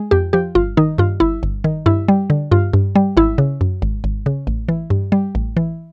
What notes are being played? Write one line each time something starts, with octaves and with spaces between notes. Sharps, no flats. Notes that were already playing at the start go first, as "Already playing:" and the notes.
Already playing: G#3
F2 G4
F3 G4
G1 F4
D#3 D#4
G2 F4
G1 E4
G1
D#3
G2 E4
G3
D3
G2 F4
G2
G3
G#1 E4
C#3
F#2
G#1
G#1
C#3
A1
E3
G2
G3
A1
E3